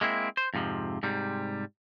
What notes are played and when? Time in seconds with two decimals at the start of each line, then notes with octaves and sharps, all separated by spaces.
0.01 G#3 A#3 C4 E4
0.37 C5
0.54 F2 G#2 C3 F3
1.03 G#2 C3 G3